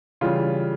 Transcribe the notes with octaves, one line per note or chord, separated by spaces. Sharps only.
C#3 E3 G3 F4